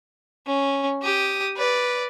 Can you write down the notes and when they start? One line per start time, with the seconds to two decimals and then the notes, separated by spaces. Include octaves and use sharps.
0.46 C#4
1.02 G4 D#6
1.56 B4 D5